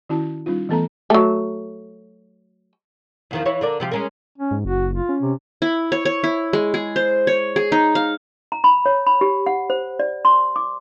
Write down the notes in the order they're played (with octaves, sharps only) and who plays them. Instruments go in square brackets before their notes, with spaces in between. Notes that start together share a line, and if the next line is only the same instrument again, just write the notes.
[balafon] D#3 C#4 E4 F#4 A5
G3 C#4 D#4 F4
E3 A3 B3 A4 A5 A#5
[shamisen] F#3 A3
[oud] E2 D#3 F3
E3 E4 C#5
D3 A#4 D5
C3 F3 G4
G#3 C#4 A#4
[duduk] C#4
[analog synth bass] G#2
[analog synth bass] F#1 [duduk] F#4
[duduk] F4
[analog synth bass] C#4
[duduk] C3
[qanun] E4
C#5
C#5
E4
G#3
G#4
C5
C#5
G#4
D#4
F5
[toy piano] A#5
B5
C#5
B5
G4
F#5
C5
D5
C6
D6